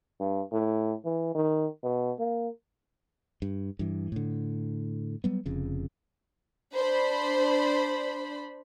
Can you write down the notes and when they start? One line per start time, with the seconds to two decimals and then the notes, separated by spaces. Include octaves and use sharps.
0.20 G2
0.53 A2
1.05 E3
1.35 D#3
1.83 B2
2.19 A#3
3.42 G2
3.79 G2 E3
4.12 A2 D3
5.24 F#3 G3 B3
5.46 F1 F2 C#3
6.73 D4 C5 B5